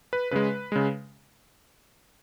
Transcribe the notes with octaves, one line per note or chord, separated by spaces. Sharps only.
B4
C#3 G#3 B4
C#3 G#3